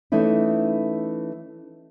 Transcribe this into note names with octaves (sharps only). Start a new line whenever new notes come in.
E3 A3 C#4 D#4 E4